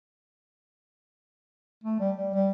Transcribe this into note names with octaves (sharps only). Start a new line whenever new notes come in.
A3
G3
G3
G3